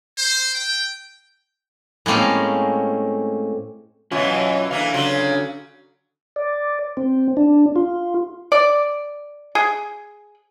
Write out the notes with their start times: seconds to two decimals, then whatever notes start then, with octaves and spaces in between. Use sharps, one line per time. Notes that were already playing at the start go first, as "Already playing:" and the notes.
0.18 C5
0.54 G5
2.06 A2 G#3 A#3 C4 C#4
4.12 F#2 B2 E3 F#3 C#4 F4
4.71 D3 E3 A#3 F5
4.94 C#3 F#3 F4
6.36 D5
6.97 C4
7.37 D4
7.76 F4
8.52 D5
9.55 G#4